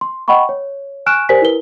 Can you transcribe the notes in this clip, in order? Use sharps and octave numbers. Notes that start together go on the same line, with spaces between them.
C6
D#5 F#5 G5 B5 C#6
C#5
G#5 C#6 F6 F#6 D7 E7
G4 A#4 C5 D5 G#5 B6
E4 A#4 B4 G7